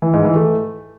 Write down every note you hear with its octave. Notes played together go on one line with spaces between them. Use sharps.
E3
G#2
E3
A3